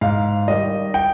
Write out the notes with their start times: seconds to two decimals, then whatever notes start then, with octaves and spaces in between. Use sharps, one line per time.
0.01 G#2 F5
0.48 D#3 G3 D#5
0.94 G5